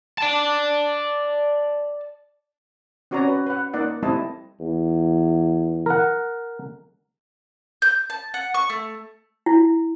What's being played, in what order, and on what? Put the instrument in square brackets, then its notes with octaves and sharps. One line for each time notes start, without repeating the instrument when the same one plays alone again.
[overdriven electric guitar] D5 A5
[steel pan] C4 C#4 F#4 C#5 D5 A#5
B4
B4 F#5
A#3 D#4 D5 F#5
G3 A3 C4 E4 D#5 A5
[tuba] E2
[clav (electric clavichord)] A#4 F#5
[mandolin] G6
A5
F#5
C#6
A3
[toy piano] E4